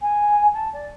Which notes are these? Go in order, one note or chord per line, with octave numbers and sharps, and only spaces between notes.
G#5
A5
D5